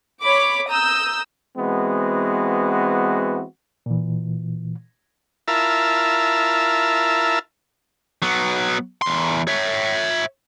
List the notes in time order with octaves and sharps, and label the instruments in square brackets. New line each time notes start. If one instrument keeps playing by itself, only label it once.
[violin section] C#5 B5 D6
A#5 D#6 E6 G6
[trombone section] E3 G#3 B3 C4 F#4
[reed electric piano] A#2 E3
[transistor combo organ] E4 F4 A#4 E5 A5
[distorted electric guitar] F#3 B3
E2 C6
C#5 E5